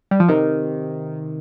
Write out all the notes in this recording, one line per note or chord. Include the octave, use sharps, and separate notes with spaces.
G3
F3
C3 D#3